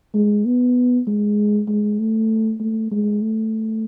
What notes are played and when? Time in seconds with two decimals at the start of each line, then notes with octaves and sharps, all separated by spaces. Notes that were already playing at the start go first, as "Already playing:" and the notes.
0.15 G#3
0.46 B3
1.07 G#3
1.68 G#3
1.99 A3
2.60 A3
2.92 G#3
3.22 A3